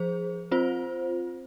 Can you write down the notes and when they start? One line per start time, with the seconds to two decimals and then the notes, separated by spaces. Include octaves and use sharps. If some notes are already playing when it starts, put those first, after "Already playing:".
Already playing: F3 G#4 C5
0.51 C4 F4 C5